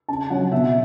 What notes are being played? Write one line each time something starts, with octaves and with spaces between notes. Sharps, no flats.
C#3 A5
F#3 C#4 F#5
B2 E5